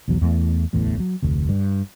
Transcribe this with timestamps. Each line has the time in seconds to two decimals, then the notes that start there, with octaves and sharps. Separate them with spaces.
0.08 B1 E2 F#3
0.21 E2 G#3 A3
0.73 D1 A1 E2 A2
1.00 F#3
1.22 F1 D2
1.49 G2